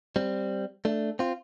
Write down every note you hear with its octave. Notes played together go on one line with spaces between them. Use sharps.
G3 C4
A3 D4
C4 F4